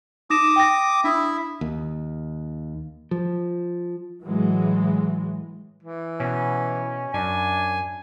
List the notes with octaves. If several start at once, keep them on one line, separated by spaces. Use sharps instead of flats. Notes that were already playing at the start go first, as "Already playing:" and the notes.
D#4 D6 D#6 A#6 E7
G5 A#6
D4 E4 E5 D#6
D#2
F3
A2 E3 F#3 G#3
E3
B2 C#4
F#2 D4 G#5